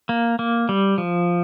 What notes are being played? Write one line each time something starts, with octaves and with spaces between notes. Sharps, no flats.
A#3
A#3
G3
F3